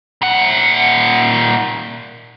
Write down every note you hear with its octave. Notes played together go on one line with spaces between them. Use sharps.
A#2 F#5